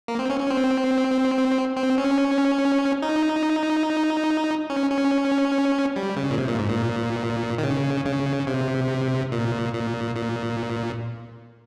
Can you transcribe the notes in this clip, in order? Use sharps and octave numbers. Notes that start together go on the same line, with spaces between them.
A#3
C4
C#4
C#4
C4
C4
C#4
D#4
C#4
C#4
G3
C#3
A#2
C3
A#2
G#2
A#2
D#3
C#3
C#3
C3
A#2
A#2
A#2